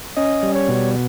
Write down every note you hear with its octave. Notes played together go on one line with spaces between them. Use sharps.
C#4 D#5
G3
C#5
B2